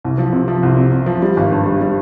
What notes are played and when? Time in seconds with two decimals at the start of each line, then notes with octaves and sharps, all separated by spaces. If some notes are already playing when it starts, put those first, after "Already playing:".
0.04 C2
0.18 F3
0.33 C3
0.48 F3
0.63 C2
0.77 C3
0.92 C3
1.06 F3
1.22 G3
1.37 G#1
1.52 G2
1.65 G3
1.81 G3